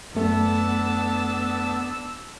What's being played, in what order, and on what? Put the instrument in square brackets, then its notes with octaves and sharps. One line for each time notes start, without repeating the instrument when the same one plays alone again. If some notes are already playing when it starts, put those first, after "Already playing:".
[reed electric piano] F#2 A3 A4 [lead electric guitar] B3 [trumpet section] D4 A5 [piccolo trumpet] E6